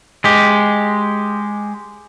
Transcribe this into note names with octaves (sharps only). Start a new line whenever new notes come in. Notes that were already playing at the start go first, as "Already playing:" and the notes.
G#3 G4